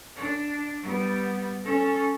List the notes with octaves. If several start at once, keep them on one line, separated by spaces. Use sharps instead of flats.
D4
G3 B3
C#4 A4